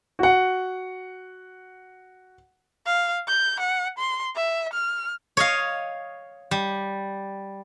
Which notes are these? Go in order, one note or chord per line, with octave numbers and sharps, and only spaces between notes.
F#4 F#5
F5
G6
F#5
C6
E5
F6
C#5 D#5 F5
G3